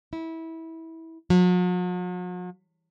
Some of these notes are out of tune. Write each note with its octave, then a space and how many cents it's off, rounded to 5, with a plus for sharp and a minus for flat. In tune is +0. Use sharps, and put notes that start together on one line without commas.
E4 -20
F#3 -45